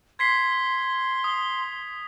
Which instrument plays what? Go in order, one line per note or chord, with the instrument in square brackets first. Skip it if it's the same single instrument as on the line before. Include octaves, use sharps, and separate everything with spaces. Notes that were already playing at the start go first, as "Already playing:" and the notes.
[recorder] C6 [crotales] G#6 B6 C7
[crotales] D#6